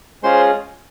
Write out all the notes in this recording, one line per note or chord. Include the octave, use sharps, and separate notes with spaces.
G#3 C#4 F4 G#4 C5 C6